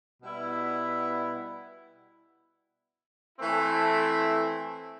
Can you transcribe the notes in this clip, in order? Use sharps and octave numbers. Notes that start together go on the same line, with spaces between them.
B2 G3 B3 E4
E3 A3 C4 E4